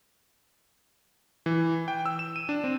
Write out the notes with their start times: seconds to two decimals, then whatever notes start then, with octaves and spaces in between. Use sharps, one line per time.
1.46 E3
1.88 G5
2.06 E6
2.19 E7
2.36 D#7
2.49 D4
2.64 C4